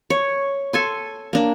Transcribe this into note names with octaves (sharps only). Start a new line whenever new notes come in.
C#5
A4 G#5 C6
A#3 D4